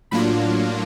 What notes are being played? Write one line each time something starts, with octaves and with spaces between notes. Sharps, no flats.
A2 F#3 A#3 D4 F4 B5